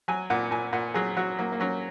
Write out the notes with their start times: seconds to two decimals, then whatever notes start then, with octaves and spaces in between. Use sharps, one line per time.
0.08 F#3 G#5
0.30 A#2 F#5
0.51 A#2 G#5
0.73 A#2 F#5
0.94 F#3 G#4
1.17 F#3 F#4
1.39 F#3 A#3
1.52 A#3
1.60 F#3 C#4